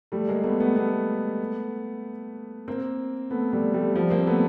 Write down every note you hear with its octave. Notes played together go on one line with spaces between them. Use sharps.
G3 A3
G#3 A#3
A3 B3
A3 B3
A3 B3
A#3 C4
A3 B3
G3 A3
G3 A3
F3 G3
A#3 C4
A3 B3